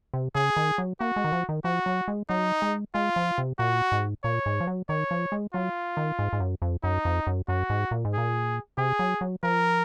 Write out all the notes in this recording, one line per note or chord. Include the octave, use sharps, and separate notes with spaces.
C3
C#3 G#4
D#3
F#3
A#3 F#4
G#3
D#3
F3
D#3
F3 F#4
F#3
G#3
F#3 D#4
G#3
G#3 F4
F3
C3
A#2 F#4
G#2
A#2 C#5
G#2
F3
F#3
D#3 C#5
F3
G#3
F#3 F4
D#3
G#2
G#2
F#2
F2
F#2 D#4
F2
F#2
F#2 F#4
G#2
A#2
G#2
A#2 G#4
C3 G#4
F#3
F#3
F3 A#4